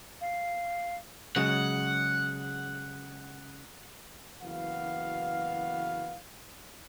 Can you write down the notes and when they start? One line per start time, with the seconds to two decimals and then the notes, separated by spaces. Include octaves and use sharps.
0.21 F5
1.36 C#3 F#3 G#3 F#5
4.42 F#1 E3 B3 F#4 F5